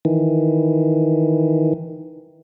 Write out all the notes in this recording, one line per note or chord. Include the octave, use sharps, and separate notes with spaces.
D#3 E3